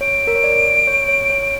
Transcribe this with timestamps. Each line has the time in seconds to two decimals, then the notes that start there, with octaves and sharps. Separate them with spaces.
0.01 C#5 D7
0.27 A#4
0.35 C#5
0.44 D5
0.87 C#5
1.08 C#5
1.30 C#5